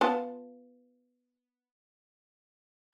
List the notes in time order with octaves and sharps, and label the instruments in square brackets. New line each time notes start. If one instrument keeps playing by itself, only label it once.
[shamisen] B3 F4 A5